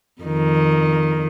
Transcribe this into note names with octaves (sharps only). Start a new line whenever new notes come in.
F2 D#3